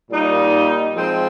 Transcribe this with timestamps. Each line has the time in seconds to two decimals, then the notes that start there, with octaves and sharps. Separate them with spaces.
0.11 A#2 G3 A#3 D#4
0.95 F3 G#3 C4